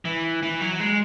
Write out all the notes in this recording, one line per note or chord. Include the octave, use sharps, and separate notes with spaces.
E3
E3
F#3
G#3